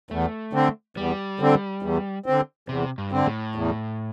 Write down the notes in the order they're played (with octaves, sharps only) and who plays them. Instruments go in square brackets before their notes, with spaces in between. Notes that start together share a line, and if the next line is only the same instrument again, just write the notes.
[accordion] E2 [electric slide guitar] A3
[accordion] D3 C4
[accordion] E2 [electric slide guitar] G3
[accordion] D3 C4
E2
D3 C4
[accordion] E2 [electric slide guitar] C3
[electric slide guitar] G2
[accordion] D3 C4
[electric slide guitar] A2
[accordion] E2